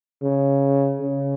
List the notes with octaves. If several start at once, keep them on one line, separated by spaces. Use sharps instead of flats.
C#3
C#3